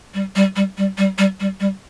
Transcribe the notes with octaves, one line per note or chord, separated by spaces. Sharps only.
G3
G3
G3
G3
G3
G3
G3
G3